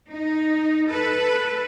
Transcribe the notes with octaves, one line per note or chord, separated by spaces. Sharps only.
D#4
A4 B4